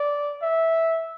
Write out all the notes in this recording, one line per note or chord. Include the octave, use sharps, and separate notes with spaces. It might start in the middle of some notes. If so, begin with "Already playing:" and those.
Already playing: D5
E5